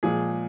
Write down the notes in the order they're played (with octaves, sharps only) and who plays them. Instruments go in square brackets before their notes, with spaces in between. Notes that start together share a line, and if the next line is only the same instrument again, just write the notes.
[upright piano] A#2 F3 G#3 [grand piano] G#4